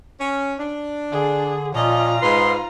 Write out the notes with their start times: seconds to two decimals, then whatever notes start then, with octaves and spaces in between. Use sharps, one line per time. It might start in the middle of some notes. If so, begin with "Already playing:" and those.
0.20 C#4
0.59 D4
1.12 D3 G#4
1.74 A#2 F3 C#4 F4 D#5 A#5
2.22 G#2 B4 C6